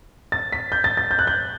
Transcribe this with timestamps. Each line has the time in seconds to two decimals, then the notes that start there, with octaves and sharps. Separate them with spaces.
0.32 A6
0.52 B6
0.72 G6
0.84 A6
0.97 A6
1.11 G6
1.19 F#6
1.27 G6